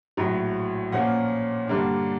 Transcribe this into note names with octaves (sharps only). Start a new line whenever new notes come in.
A#1 A2 F#3
A#2 F3 A#3 C#4 F4 F#5
G2 D3 G3 A#3 D4